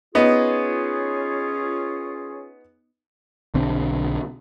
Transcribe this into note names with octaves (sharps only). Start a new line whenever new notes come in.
B3 C#4 D#4 F4 G#4
B1 D3 C4